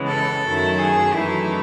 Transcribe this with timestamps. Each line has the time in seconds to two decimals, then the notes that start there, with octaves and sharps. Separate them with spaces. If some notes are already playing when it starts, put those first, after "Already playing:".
Already playing: C#3 E3 G#3 B3
0.08 A4
0.43 F#2 D#3 F#3 A3 E4
0.79 G#4
1.12 F#2 E3 A3 D#4 E4